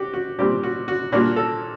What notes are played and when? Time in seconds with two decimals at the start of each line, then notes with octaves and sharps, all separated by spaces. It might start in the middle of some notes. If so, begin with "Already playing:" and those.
Already playing: F#4 G4
0.13 F#4
0.39 A#2 G3 C4 G4
0.63 F#4
0.88 F#4
1.12 A#2 G3 A#3 D4 F#4
1.36 A4